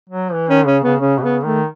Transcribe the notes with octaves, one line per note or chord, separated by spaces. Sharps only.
F#3
E3
D#3 C#4
C#3 C#4
C#3 B3
C#3 C#4
B2
C#3 B3
D#3 A3